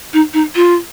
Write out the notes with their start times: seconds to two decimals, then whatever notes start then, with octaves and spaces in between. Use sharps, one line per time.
0.13 D#4
0.33 D#4
0.55 F4